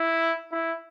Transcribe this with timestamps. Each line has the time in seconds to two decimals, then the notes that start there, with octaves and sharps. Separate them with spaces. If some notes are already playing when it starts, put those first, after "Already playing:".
Already playing: E4
0.52 E4